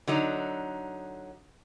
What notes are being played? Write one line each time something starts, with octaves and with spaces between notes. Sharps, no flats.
D3 F#3 D#4